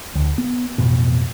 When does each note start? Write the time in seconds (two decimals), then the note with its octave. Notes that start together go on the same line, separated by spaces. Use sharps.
0.15 D2
0.38 B3
0.78 A1 F2 B2